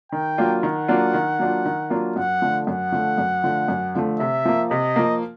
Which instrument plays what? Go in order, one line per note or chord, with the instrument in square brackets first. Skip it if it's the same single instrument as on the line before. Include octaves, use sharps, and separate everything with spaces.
[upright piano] D#3 [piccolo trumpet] G5
[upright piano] F#3 A#3 D4 F4
[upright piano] D#3 [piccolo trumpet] F#5
[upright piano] F#3 A#3 D4 F4
D#3
F#3 A#3 D4 F4
D#3
F#3 A#3 D4 F4
[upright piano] F#2 [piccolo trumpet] F#5
[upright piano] D3 F3 A3
[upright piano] F#2 [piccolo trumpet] F#5
[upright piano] D3 F3 A3
F#2
D3 F3 A3
F#2
D3 F3 A3
[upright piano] C3 [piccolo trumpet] E5
[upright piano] F3 A#3
[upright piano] C3 [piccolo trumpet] D#5
[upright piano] F3 A#3